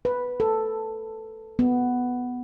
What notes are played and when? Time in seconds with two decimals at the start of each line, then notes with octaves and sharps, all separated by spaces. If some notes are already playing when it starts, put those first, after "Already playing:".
0.05 B4
0.40 A4
1.59 B3